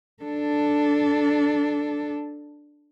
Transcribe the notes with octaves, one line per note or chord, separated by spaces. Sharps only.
D4 A4